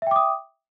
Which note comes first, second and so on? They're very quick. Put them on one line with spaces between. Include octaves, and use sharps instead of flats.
E5 G5 D6 D#6